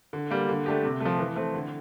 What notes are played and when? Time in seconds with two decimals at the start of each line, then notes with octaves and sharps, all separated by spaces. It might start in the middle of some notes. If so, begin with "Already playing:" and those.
0.13 D3
0.31 G3 A#3
0.49 D3
0.66 A3 D4 G4
0.83 C3
1.00 F3 A3
1.19 E3
1.36 A3 C4
1.54 D3